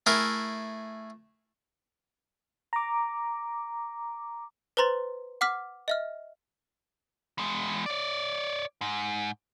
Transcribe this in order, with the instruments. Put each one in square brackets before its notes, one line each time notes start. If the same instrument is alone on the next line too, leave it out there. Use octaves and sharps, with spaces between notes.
[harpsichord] A3 E4 G#4 A#4
[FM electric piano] A#5 D6
[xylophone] B4 C5 A#5 C6 A6
F#5 D6 F6 B6
D#5 E5 F6
[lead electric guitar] E2 G#3
C#5 D5
G#2